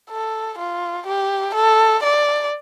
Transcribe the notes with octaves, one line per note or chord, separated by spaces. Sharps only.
A4
F4
G4
A4
D5